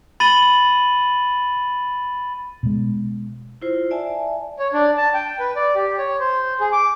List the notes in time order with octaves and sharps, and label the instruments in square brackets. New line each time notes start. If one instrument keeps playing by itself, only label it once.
[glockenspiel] B5 A6 D#7 F#7 G7
[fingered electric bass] B2 G#3
[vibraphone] E4 F4 C5
D5 E5 G#5 A5
[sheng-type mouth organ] C#5
D4
A5
G5
B4
D5
G4
C#5
C5
G#4
D6